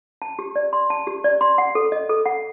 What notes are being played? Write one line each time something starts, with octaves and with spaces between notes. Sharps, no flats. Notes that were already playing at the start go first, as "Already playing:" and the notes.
A5
G4
D5
C6
A5
G4
D5
C6
F#5
A4
D#5
A4
F#5